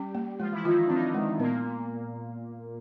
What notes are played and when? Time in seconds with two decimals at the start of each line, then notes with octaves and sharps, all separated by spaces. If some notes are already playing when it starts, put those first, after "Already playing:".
Already playing: G3 C#4 G4
0.15 A#3
0.40 F3 G#3 F4
0.52 E3 E4
0.64 D#3 D#4 F4
0.77 D#4
0.86 C4 D4
0.95 D#3 D#4
1.14 G#3
1.39 A#2 A#3 B3